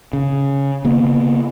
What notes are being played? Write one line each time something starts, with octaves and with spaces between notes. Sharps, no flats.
C#3
C#3 A#3 B3